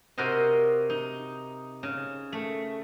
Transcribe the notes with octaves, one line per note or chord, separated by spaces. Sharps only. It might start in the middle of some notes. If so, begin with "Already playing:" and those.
C3 F#4 A#4 C5 D#5
D#4
C#3
A3